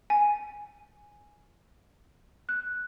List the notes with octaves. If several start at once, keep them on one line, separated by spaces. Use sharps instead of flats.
G#5
F#6